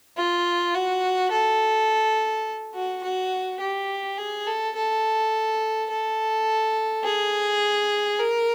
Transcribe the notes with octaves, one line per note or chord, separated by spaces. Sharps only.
F4
F#4
A4
F#4
F#4
G4
G#4
A4
A4
A4
G#4
A#4